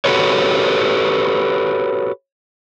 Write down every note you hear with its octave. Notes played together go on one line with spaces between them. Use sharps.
F#4 G4 A4 B4 C#5